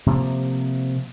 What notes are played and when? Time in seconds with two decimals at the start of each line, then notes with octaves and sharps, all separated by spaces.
0.06 C3 F3 A#3